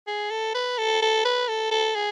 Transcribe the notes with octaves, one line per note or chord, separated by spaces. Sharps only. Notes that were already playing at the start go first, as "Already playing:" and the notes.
G#4
A4
B4
A4
A4
B4
A4
A4
G#4